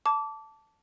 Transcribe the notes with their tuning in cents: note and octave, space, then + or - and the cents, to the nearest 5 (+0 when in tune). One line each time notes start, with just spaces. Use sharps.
A5 +0 D6 -25